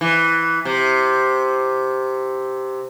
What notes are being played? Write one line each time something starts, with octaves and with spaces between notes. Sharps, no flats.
E3
C3